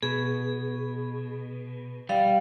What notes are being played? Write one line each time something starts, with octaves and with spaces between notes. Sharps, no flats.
B2 G#4
G3 F5